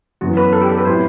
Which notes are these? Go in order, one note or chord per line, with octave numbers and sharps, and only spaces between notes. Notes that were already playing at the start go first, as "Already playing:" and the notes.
F#2 E3 B3 F#4
B4
A4
G4
A4
B4
A2 F#3 C4 E4 G4 C5